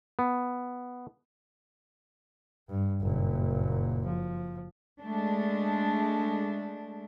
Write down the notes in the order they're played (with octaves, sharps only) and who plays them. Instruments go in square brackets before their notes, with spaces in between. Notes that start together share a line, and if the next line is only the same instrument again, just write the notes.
[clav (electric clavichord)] B3
[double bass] G2
F#1 A#2
F3
[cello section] G#3 A3 D4